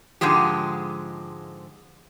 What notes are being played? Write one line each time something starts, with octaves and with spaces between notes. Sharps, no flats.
G#2 D3 F3 G#3 G4